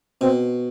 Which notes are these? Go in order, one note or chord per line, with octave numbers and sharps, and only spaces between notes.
B2 C4